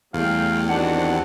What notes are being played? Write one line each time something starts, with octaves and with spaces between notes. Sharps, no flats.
E2 G3 A3 F5 G5
D#3 C4 D4 F#4 G4 F#5